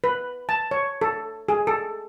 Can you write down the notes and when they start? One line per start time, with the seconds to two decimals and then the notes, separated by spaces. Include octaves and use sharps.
0.04 B4
0.49 A5
0.71 C#5
1.01 A4
1.49 G#4
1.67 A4